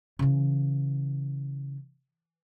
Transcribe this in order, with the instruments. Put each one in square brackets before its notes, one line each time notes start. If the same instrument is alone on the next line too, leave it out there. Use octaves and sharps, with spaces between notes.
[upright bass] C#3 E3